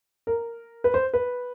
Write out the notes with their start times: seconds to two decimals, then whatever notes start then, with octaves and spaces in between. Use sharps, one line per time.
0.27 A#4
0.84 B4
0.94 C5
1.14 B4